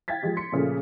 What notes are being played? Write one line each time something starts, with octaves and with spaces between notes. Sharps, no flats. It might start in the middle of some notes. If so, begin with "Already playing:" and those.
F5 G5 G#6 A6 B6
F3 G#3 G4
C6 B6 C#7
A#2 C#3 F3 A3